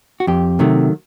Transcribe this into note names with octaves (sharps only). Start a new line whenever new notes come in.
F#4
F2 G4
C3 D#3 F#3 A3